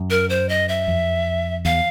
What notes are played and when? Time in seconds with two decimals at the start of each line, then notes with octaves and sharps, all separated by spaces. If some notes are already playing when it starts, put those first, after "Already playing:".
Already playing: F#2
0.10 A#4
0.30 C5
0.49 D#5
0.69 E5
0.88 F2
1.65 E2 F5